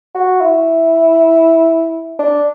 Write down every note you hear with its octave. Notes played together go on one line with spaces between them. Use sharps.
F#4
E4
D4